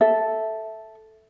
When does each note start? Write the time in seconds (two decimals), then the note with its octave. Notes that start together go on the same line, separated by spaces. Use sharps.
0.01 A4 E5